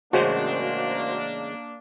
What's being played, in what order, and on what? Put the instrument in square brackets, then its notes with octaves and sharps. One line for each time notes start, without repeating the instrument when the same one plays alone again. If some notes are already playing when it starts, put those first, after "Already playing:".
[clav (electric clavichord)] A1 C#3 G#3 [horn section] A#3 D4 [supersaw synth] F#4 C5